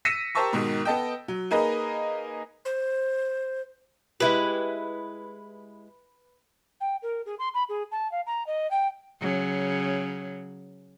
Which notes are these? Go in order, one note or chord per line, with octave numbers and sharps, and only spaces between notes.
E6 A#6 B6 C#7 D#7 E7
G4 A#4 C5 A5 C#6 E6
G#2 B2 D#3
B3 A4 D#5 G5
F#3
A#3 D#4 G#4 A#4 B4 D#5
C5
G#3 E4 G4 B4
G5
A#4
G#4
C6
B5
G#4
A5
F5
A#5
D#5
G5
C#3 F#3